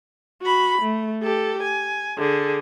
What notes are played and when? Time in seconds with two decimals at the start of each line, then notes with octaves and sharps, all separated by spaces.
0.42 F#4 B5
0.82 A3
1.23 G4 A4
1.62 G#5
2.18 D3 G#4